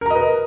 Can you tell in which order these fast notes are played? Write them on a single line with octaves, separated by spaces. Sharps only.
A#4 A#5 D#5 B4